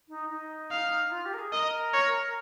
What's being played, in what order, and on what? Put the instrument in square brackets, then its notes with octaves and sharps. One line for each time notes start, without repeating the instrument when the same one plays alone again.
[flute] D#4
D#4
[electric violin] F5
[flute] F4
G4
A#4
G#4
[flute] A#4 [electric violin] D#5
[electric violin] C#5